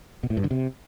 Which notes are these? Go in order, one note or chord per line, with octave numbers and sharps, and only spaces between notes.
B2
A2
G2
D3
C3